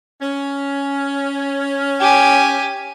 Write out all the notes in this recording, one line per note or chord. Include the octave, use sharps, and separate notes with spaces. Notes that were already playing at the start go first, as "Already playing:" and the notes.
C#4
G4 G#5